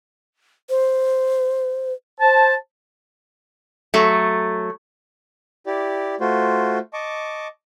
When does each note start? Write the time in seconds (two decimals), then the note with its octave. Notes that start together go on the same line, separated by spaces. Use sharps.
0.70 C5
2.20 C5 A5
3.94 F#3 A3
5.67 E4 G4 D5
6.20 A3 F4 F#4 C5
6.93 D#5 A5 C#6 D6